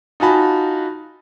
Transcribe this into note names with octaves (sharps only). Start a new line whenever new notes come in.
D#4 F4 F#4 G#5 A5 B5